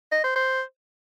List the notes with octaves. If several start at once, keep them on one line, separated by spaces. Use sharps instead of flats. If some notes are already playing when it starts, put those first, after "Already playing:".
D#5
C5
C5